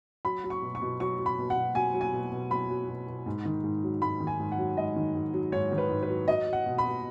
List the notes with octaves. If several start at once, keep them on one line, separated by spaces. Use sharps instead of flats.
F#3 B5
F#3
C#6
B2
C#6
B2
F#3 C#6
F#3
B5
B2
F#5
B2
F#3 G#5
F#3
G#5
B2
B2
F#3 B5
F#3
B2
B2
G#2
D#3
G#2
F#3
G#2 B5
D#3
G#5
G#2
F#5
F#3
G#2 D#5
D#3
G#2
F#3
G#2 C#5
D#3
B4
G#2
B4
F#3
F#3 D#5
F#3
F#5
B2
B5
B2